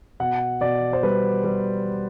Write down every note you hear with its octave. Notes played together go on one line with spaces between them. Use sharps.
B2 F#5
B2 D5
C5
G3 B4
G3